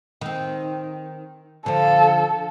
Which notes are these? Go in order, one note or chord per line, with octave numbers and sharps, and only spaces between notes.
D#3 C4
D3 F3 A4